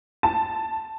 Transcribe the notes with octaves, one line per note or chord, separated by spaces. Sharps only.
A5